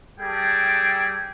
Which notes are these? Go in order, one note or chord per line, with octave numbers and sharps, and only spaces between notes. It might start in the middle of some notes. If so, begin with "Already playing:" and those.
G3 G#4 A4 G5